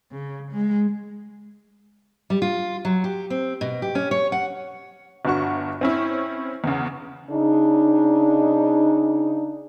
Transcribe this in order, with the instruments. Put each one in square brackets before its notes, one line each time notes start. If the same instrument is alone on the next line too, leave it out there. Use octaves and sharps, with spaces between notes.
[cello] C#3
G#3
[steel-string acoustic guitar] G3
F4
F#3
G4
C4
B2
G4
C#4
C#5
F#5
[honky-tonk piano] G1 G2 F#4 C#6
C4 C#4 E4
E2 C#3
[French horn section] C#3 D4 D#4